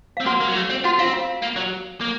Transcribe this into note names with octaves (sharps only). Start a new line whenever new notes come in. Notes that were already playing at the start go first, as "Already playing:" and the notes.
C4 F5
A#3 F#4 F#5
A#3
F#3
A3
C4
F4 F#4 F#5
C4 F4 F5
F4 F5
A#3
F#3
A#3